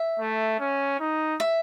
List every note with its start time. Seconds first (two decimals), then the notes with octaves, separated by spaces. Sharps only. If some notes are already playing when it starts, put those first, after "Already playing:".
Already playing: E5
0.20 A3
0.60 C#4
1.00 D#4
1.40 E5